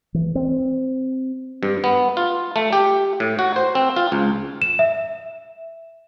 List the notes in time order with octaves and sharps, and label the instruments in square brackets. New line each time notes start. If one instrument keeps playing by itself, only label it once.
[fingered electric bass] E3
C4
[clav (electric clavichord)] G2
B3
F4
A3
G4
A2
F#4
C5
C4
F4
C#2
[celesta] E7
E5